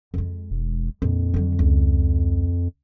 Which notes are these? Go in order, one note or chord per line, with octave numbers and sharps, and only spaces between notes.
F2 G#3
E1
A#1 F2
D3 F#3
C#2